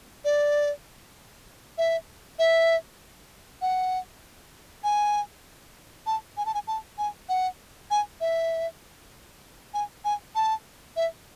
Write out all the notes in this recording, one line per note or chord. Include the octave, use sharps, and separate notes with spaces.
D5
E5
E5
F#5
G#5
A5
G#5
A5
G#5
A5
G#5
F#5
G#5
E5
G#5
G#5
A5
E5